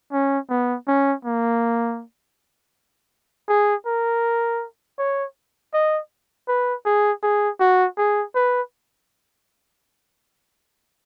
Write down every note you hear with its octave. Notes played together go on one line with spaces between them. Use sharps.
C#4
B3
C#4
A#3
G#4
A#4
C#5
D#5
B4
G#4
G#4
F#4
G#4
B4